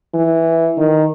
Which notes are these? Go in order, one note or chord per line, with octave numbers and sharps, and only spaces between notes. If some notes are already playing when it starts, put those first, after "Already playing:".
E3
D#3